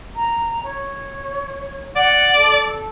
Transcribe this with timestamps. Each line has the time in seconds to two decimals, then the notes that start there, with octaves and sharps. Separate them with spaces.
0.16 A#5
0.64 C#5
1.96 D5 F#5
2.36 A4